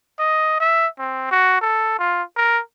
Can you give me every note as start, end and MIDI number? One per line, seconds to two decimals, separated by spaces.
0.19 0.59 75
0.60 0.87 76
0.99 1.27 60
1.31 1.60 66
1.61 1.97 69
1.99 2.23 65
2.37 2.60 70